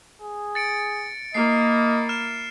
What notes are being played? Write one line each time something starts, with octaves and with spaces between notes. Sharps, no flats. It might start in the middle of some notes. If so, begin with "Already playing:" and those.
G#4
A6 C#7 D7
A#3 E4 D#5 C7
F6 E7